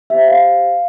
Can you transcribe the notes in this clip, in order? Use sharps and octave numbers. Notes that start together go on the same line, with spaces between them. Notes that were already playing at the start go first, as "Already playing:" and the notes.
G4 C5 E5
F5